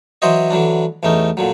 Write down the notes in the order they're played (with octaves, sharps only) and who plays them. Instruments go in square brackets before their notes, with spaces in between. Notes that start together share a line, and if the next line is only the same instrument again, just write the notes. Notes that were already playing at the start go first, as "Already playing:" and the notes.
[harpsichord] E3 F#3 E4 C5 C#5 D#5
D3 E3 F#3 D4
A1 E2 A3 C#4 D#4
A#2 D3 F#3